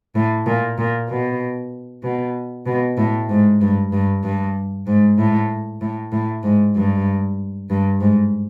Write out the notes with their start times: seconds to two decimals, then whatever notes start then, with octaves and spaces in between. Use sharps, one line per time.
0.15 A2
0.46 A#2
0.78 A#2
1.09 B2
2.03 B2
2.66 B2
2.98 A2
3.29 G#2
3.61 G2
3.92 G2
4.23 G2
4.87 G#2
5.18 A2
5.81 A2
6.12 A2
6.43 G#2
6.75 G2
7.70 G2
8.01 G#2